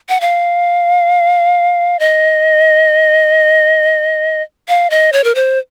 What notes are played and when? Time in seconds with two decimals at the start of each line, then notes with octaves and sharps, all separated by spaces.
0.09 F#5
0.21 F5
1.99 D#5
4.68 F5
4.90 D#5
5.13 C#5
5.24 A#4
5.35 C5